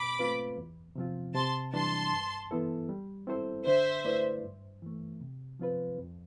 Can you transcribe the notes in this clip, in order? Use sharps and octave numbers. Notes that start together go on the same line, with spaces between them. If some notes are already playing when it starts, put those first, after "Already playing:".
Already playing: B2 B5 D6
A3 C4 F4 B4
E2
C3 F3 C4 F4
C3 A5 C6
E3 G3 D4 A5 C6
G2
E3 B3 E4 A4
G3
C4 E4 A4 C5
D3 C5 E5
A3 E4 B4 D5
G2
E3 A3
C3
F3 C4 F4 B4
F2